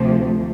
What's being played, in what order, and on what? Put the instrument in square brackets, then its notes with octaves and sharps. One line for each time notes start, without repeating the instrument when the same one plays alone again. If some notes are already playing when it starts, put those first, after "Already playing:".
Already playing: [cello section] D2 C3 F3 A3